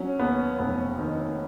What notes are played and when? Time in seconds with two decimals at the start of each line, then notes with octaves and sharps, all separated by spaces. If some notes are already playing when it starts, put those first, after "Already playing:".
Already playing: F#3 C#4
0.19 D#2 B3
0.59 F1 B3
0.99 D#3